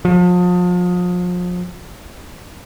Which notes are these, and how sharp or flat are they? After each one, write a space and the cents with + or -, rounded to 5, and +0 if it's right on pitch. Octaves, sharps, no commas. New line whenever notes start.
F3 +35